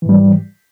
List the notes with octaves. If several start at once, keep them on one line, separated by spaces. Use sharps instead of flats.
G#2 E3 G3